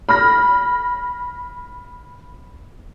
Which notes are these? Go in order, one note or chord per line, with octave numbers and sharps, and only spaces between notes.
B5 F6 A#6